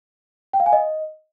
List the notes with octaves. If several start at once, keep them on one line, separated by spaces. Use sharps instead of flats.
G5
F5
G#5
D#5